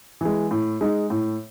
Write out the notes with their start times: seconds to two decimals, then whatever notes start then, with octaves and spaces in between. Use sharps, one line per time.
0.21 E3 G#3
0.51 A2
0.81 G#3 D#4
1.10 A2